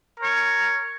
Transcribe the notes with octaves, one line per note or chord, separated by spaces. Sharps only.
A#4 C#5